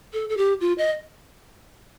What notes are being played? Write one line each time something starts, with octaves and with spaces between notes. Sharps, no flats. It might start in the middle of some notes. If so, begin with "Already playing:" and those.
A4
A4
G4
F4
D#5